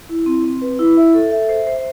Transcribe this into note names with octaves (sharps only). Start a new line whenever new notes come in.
E4
C4
C4
B4
E4
E5
A4
E5
C5
C5